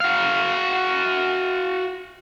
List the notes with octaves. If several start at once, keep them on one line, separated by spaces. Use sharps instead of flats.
F#4 F5